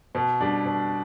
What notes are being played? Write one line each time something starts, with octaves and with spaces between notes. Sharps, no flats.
B2
G3 D4
B2